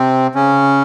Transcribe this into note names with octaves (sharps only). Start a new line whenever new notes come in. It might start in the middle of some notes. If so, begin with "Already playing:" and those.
Already playing: C3 C4
C#3 C#4